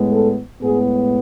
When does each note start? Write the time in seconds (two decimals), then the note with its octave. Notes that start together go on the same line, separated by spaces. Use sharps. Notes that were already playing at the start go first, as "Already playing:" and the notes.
Already playing: A2 G#3 B3
0.12 A4
0.61 A2 G#3 B3 G#4